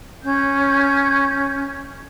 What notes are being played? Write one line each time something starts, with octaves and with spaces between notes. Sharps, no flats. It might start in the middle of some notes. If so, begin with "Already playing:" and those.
C#4 G6